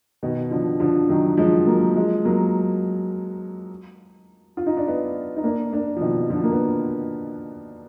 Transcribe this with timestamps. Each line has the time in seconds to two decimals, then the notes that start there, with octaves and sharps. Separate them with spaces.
0.23 B2 D#3
0.51 D3 F3
0.80 D3 F3
1.09 D#3 F#3
1.37 F3 G#3
1.66 F#3 A#3
1.95 F3 G#3
2.25 F#3 A#3
4.57 F4
4.66 D#4
4.77 D4
4.87 B3 D#4
5.37 D#4
5.44 A#3 D4
5.73 A#3 D4
5.96 F3
6.01 B2 D#3
6.30 D3 F3
6.44 A#3
6.52 B3